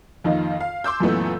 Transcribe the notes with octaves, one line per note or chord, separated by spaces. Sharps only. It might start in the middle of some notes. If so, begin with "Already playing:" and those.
F2 D#3 A#3 D#4 F4
F5
C6 D6 E6 G6
F#2 A#2 E3 A3 B3